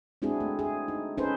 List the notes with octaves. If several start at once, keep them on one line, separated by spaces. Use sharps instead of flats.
G#3 C4 D4 E4 F#4 G#4
A3
G#4
D#4
C#4 D#4 G#4 A4 B4 C5